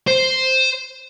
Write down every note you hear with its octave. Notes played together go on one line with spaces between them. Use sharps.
C5